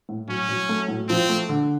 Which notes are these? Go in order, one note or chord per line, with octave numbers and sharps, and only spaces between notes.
A2
F#3 C#4
F#3
A3
A2
F3 C4
A3
D3